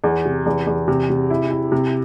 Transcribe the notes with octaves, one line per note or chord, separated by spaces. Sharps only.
E2
C3
E2
E2
C3
C3
E4
E4
C3